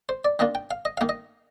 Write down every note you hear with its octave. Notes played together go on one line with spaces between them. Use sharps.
C5
D5
D#3 A#3 D4 F4 D#5
G5
F5
D#5
D#3 A#3 D#4 F5
D#5